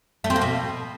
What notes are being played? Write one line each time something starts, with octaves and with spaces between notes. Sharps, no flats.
A3
C4
A#3
B2